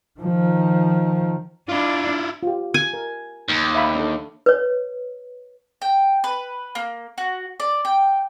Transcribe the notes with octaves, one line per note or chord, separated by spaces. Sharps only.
D#3 F3
D4 E4 F4
F4 G4
G#5
A#4
D#2
E5 F5 B5
D4 A4
B4 C#5
G5
B4
A#3
F#4
D5
G5